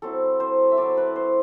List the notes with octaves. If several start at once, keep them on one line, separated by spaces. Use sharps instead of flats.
F#3 C4 E4 A4
C5
E5
F#3 C4 E4 D5
B4
C5